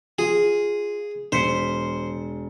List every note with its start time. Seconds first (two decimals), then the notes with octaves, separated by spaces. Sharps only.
0.19 F4 G#4
1.32 E1 C5 B6 C#7